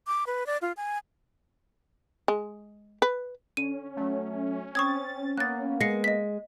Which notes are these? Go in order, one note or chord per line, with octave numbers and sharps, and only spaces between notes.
D6
B4
D5
F4
G#5
G#3
B4
D3 C#4 D#7
F#3 A3
C4 C#6 D#6 G#6 A6
A#3 B3 F#6 A6
G#3 A#6 C7 C#7
D#5 B6